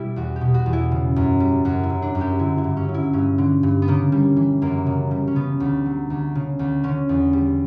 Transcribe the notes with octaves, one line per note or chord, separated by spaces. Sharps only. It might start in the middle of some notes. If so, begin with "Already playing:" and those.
Already playing: B2 G3 E4
E2 F#4
G4
B2
F#4
E2
E4
C#3
F#2
G3
F#2 F#4
E4
C#3
D4
F#2
G4
D3 E4
E4
G2
C#4
F#3
E4
G2 C#4
D3
G2
B3
C#3 A#3
G3
E3
F#2 A#3
C#3
G3
C#4
C#3 B3
D2
F#3
D2
C#3
D2
D3 C#4
E2
G3